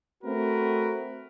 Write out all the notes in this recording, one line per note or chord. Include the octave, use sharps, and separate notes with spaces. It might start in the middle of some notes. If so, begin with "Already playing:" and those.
A3 C4 F#4 A#4 B4